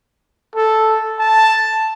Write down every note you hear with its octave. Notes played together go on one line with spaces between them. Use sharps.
A4
A5